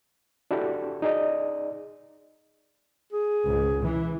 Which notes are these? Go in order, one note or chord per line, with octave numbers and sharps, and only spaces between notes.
D4 E4 F#4 G4 A4
D#4 G#4 D5 D#5
G#4
C#2 G#2
E3